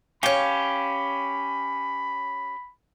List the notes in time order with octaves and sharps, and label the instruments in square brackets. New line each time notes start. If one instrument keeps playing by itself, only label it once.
[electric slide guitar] C#4 G4 [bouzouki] C#5 F5 [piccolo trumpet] B5